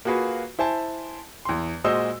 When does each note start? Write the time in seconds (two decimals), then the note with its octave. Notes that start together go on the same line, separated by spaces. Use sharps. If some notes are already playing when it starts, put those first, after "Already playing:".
0.05 A#3 F4 F#4 G#4 B4
0.59 E4 C5 G#5 A5
1.45 E2 C6
1.84 A#2 G#3 F#4 C5 D#5 E6